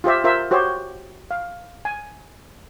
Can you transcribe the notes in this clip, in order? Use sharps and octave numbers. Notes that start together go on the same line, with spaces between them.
F4 G4 C5 E5
F4 A#4 C5 E5
F#4 G4 C5 C#5
F5
G#5